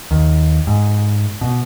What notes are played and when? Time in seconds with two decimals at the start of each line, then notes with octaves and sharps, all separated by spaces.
0.11 D#2
0.67 G#2
1.41 B2